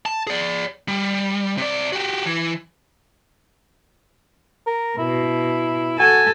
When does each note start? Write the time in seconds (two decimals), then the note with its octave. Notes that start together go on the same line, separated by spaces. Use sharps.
0.06 A5
0.27 G#4 D5
0.88 G3
1.57 C3 D5
1.92 F#4 G4
2.25 E3
4.67 A#4
4.98 B2 E4
5.99 F#4 A4 G#5